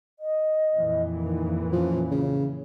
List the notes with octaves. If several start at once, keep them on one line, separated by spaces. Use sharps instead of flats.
D#5
F2 A#2 E3
D#3
F3 C#4
C#3